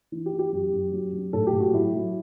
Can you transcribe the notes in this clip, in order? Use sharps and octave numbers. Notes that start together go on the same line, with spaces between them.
E3
G4
E3
G4
F#2
F#2
F#3
F#3
A2 A4
G4
A2
F#4
F#3 E4
F#3